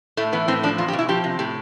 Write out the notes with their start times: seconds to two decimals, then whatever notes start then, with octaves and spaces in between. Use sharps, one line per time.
0.17 A2 A3
0.33 E3 B3
0.48 A2 C4
0.63 F3 D4
0.78 E2 F4
0.88 G4
0.93 B2
0.99 E4
1.09 F3 G4
1.24 C3
1.39 A2 G4